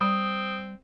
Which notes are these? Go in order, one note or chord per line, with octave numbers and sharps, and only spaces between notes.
G3 C4 D#6